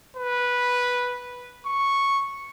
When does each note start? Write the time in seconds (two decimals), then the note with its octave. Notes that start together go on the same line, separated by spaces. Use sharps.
0.17 B4
1.66 C#6